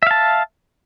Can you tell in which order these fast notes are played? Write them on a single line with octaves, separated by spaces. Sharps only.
E5 F5 A5